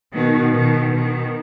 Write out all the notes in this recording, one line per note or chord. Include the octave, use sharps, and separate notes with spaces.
B2 D#3
B2 D#3
B2 D#3